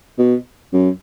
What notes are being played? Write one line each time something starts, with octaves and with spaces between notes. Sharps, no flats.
B2
F#2